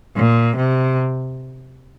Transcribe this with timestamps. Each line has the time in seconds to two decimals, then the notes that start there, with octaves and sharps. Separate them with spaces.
0.17 A#2
0.57 C3